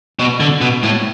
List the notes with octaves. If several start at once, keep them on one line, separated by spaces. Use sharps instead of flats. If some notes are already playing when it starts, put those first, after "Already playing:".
B2
D3
B2
A2